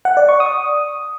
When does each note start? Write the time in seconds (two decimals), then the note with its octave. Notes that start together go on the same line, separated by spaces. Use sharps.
0.05 F#5
0.17 D5
0.29 C#6
0.40 D#6